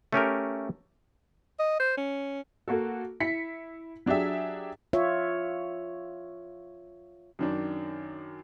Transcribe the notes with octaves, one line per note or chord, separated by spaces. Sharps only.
A3 C#4 G4 A#4
D#5
C5
C#4
A#3 F#4 A4
E4 B6 C#7
F#3 D4 G4 G#4 E5
F4 C#5 E5
F#2 D#3 D4